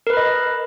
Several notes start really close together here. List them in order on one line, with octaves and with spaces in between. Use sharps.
A#4 B4 B5 D#5